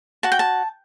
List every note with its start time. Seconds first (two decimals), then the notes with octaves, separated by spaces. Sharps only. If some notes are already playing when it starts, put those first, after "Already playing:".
0.23 F#4 A5
0.32 G5
0.39 A5